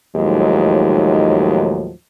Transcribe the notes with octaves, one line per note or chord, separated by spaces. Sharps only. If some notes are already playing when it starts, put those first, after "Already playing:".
D#2 A2 F3 F#3 G#3 D#4